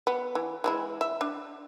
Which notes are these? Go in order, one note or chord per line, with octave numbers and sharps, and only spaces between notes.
B3
E3
E3 G#3 E4
E5
D4